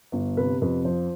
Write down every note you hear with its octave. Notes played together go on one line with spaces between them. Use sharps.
G1
C3 B4
F2 B4
F3 C5